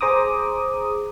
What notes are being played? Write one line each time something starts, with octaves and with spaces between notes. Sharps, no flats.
G#4 C5 A#5 D6 D#6